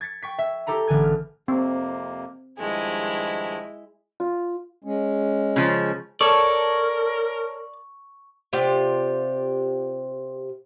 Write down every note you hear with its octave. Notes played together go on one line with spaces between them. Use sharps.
G#6 A6 B6 C#7
G5 C#6 B6
E5
E4 G4 A4 A#5 B5
A1 D3 G#5 G#6
F6
F2 C3 A#3 C4
G2 D#3 F3 G#3 E4
F4
G#3 C#4
C#3 F3
A4 A#4 C#5 D5 C#6
C3 F4 G4 D5